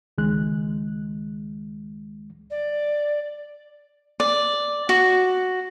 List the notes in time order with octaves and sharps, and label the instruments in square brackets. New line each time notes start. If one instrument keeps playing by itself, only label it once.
[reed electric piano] C#2 D#3 G#3 F#6
[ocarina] D5
[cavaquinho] D5
F#4